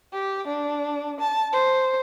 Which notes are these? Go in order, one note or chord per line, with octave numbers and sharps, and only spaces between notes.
G4
D4
A5
C5